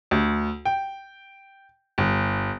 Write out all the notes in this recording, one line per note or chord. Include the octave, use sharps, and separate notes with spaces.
D2
G5
G1